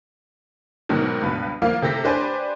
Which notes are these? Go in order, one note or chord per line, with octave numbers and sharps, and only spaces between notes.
G#2 B2 D#3 F#3
C#2 G2 B2 B4
F3 A#3 F5
C3 G4 A4 A#6 B6
D4 G4 B4 C5 D5 G#5